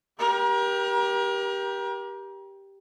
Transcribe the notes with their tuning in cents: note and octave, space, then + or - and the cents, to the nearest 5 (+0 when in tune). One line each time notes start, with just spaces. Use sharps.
G4 +0 A#4 +35